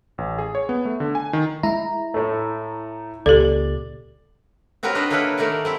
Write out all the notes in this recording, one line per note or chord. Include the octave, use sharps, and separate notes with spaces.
A1
G#4
C#5
B3
A3
D3
G#5
D#3
G#3 E4 A#5
A2 A3
C#2 A#2 G4 A4 D5
C4 F#4 G4 A#4 B4 C#5
D4 D#4 B4 C5 D#5
A#3 C#4 D4 E4 A4 B4
D#3 A3 A#4 D5 A5
C4 E4 G4